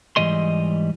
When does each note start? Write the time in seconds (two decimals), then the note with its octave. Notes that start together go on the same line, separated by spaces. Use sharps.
0.16 G#2 E3 G3 D#5 C6